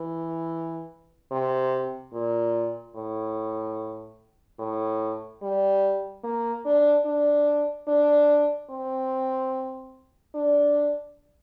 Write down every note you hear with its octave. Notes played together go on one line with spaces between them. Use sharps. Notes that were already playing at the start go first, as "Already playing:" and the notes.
Already playing: E3
C3
A#2
A2
A2
G3
A#3
D4
D4
D4
C4
D4